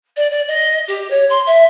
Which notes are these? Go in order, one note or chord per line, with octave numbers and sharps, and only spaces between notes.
D5
D5
D#5
G4
C#5
C6
E5